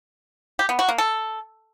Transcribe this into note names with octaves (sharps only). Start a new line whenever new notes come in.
G4
B3
F#4
A#3
A4